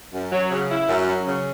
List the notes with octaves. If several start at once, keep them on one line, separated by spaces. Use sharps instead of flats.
F#2
F#3
C#3
E4
F#2
F#3
C#3